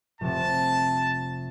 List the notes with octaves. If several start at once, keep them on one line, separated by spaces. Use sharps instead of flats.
F1 C3 A5